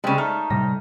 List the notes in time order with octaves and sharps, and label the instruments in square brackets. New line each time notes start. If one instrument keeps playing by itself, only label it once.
[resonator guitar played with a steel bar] C#3 G3 [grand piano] G#3 [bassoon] C4
[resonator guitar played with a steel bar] A3 [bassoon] D#4 [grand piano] F6
[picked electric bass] A2 C3 G3 [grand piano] A#6